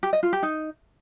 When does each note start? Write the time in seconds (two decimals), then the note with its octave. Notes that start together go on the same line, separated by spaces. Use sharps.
0.03 G4
0.13 D#5
0.23 F4
0.33 G4
0.43 D#4